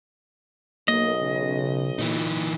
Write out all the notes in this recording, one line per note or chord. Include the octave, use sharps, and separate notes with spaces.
B1 A#3 D#5
C#3
A#2 E3 D#4